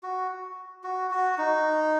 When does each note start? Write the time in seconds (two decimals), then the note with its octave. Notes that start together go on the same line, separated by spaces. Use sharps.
0.03 F#4
0.84 F#4
1.11 F#4
1.38 D#4